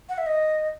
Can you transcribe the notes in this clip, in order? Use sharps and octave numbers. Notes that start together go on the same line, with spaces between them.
F#5
E5
D#5